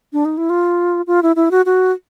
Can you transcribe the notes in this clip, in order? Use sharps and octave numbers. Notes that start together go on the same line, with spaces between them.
D4
D#4
E4
F4
F4
E4
E4
F#4
F#4